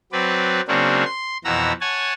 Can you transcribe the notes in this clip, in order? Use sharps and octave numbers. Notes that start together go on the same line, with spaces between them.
F#3 C4 B4 D5
C#3 F#3 A#3 C4 D4 F#4
C6
F2 B2 E3 F#5 A#5 E6
C#5 F#5 G#5 A5